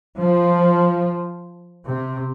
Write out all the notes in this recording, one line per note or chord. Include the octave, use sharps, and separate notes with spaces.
F3
C3